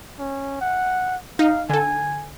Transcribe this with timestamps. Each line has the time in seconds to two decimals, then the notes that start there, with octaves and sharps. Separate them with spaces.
0.19 C#4
0.61 F#5
1.39 D#4 F5
1.70 D3 A4 G#5